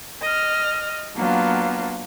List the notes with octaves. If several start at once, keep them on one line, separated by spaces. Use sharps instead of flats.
D#5 F6
F#3 A#3 B3 D4 F4